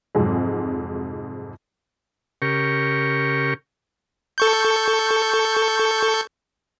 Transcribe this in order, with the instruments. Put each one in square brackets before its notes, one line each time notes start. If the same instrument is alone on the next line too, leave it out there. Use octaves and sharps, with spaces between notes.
[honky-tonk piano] F2 G#2 C3 F#3 G#3
[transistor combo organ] C#3 G4 A#4 C#6
[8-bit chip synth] A4 C#6 G6